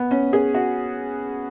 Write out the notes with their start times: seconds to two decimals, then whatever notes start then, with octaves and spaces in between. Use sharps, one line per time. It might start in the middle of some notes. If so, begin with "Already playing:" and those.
Already playing: B3
0.11 C#4
0.33 G#4
0.54 F#4